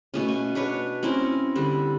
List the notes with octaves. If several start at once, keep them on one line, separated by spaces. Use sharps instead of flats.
B2 A3 C#4
G#5
D4 B4 C#5
C4 C#4 E4 A#4
D3 G3